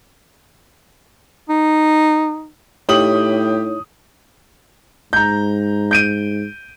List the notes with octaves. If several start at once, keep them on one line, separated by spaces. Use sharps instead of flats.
D#4
A2 D#4 E4 G4 C#5 D#6 F#7
G#2 A#5 G6
G6 D7 D#7